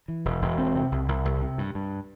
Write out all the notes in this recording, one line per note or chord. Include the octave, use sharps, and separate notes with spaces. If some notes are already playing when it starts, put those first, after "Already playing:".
E3
E1
E1
C4
C3
C2
C2
C2
C3
G2
G2